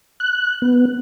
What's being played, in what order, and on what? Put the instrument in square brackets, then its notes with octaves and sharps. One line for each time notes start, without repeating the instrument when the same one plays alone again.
[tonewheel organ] F#6
B3